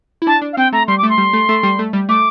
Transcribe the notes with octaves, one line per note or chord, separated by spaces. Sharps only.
E4
D4 A5
D4
F5
C4 G5
A3 A#5
G3 C6
D6
A3
C6
G3
A3
A3
G3
A3
G3
A3 D6